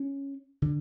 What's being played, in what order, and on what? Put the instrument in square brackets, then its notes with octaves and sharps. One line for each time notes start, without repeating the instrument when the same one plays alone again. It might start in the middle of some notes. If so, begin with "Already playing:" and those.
Already playing: [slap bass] C#4
D3